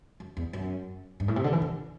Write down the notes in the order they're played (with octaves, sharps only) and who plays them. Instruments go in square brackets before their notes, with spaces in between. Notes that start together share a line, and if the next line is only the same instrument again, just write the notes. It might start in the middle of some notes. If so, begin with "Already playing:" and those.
[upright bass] F#2
E2
F#2
G2
A2
C3
D3
E3
D3